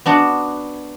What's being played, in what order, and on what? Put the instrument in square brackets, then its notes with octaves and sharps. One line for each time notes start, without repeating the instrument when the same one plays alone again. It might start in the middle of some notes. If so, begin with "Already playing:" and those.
[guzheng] B3 D4 F#4 F#5